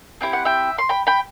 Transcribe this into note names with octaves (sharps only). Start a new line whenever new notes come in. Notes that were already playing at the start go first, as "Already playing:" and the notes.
C4 E4 G4 G5
F#5
E5 G5
C6
G5 B5
G5 B5